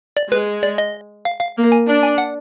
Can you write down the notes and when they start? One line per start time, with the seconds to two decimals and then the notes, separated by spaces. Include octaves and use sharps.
0.17 D5
0.31 G#3 B4
0.63 D5
0.78 D#5
1.25 F5
1.40 F5
1.56 A#3
1.72 G#5
1.88 D4
2.02 G#5
2.18 F#5